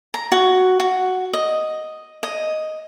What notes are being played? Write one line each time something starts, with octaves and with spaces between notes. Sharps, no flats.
A#5
F#4
F#4
D#5
D#5